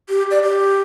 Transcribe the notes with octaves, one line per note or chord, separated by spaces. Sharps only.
G4
D5
G4